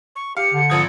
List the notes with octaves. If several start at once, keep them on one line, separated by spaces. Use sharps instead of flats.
C#6
G4 F5 C#7
D3
G#1 F3 D#6 G#6